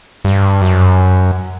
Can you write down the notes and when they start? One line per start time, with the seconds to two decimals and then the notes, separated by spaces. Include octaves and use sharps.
0.25 G2
0.61 F#2